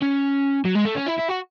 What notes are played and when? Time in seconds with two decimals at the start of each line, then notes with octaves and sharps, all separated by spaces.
0.02 C#4
0.65 F#3
0.76 G#3
0.86 A3
0.97 C#4
1.08 E4
1.19 E4
1.29 F#4